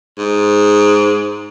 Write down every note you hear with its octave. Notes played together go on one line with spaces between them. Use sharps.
G#2